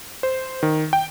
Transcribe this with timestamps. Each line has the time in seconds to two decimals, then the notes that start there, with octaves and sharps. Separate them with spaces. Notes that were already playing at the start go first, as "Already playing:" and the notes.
0.23 C5
0.63 D#3
0.93 G5